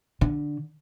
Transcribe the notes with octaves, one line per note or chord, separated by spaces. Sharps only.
D3